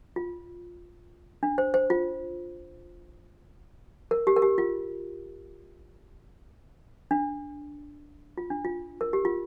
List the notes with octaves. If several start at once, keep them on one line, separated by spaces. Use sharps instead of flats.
F4
D4
C5
C5
F4
A#4
G4
A#4
G4
F4
D4
F4
D4
F4
A#4
G4
F4